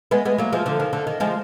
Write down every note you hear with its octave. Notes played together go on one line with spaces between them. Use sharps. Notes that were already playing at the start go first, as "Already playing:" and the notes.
G#3 B3
G#3 B3
F#3 A#3
F3 G#3
D3 F3
D#3
D3
D#3
F3 G#3